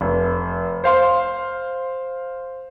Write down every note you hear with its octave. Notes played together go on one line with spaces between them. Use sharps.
F1
C5 F5 C6